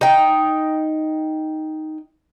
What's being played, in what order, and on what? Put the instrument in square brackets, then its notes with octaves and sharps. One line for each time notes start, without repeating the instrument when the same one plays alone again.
[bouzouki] D#4 G5